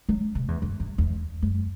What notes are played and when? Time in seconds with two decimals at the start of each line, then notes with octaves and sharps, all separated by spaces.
0.09 F#3
0.35 C#3
0.43 F#2
0.48 E2
0.62 F#2
0.80 F#2
0.98 E2
1.42 F#2